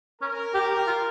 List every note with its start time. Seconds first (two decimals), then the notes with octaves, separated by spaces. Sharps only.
0.21 C#4 A#4
0.54 G4
0.71 G4
0.87 F4